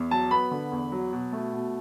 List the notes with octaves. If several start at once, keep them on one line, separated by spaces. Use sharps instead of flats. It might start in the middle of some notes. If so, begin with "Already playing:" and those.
Already playing: E2
F#3 A5
B3 B5
D3
E2
F#3
B2
A3
B2